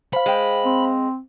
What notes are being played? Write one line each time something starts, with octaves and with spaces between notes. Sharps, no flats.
C5 F5 B5
G#3 G5
C4